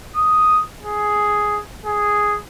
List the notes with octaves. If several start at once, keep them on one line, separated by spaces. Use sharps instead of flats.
D#6
G#4
G#4